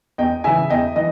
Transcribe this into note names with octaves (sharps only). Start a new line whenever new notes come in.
E2 D#5 G5
C#3 E3 E5 G#5
E2 D#5 G5
E3 D#5